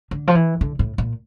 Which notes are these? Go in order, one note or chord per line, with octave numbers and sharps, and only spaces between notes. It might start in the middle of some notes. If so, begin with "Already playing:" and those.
D3
F3
E3
D3
A2
A#2